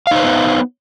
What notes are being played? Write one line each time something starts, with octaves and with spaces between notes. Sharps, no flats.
B3 D#4 B4 C5 F5